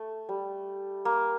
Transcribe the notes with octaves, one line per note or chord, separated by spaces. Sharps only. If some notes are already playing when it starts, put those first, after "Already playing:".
Already playing: A3
G3
A#3